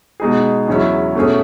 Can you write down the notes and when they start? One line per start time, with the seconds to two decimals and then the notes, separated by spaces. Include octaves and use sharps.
0.20 B2 G#3 D#4 G#4
0.68 E2 C#3 F#3 C#4 E4
1.15 B2 A3 C#4 G#4 C#5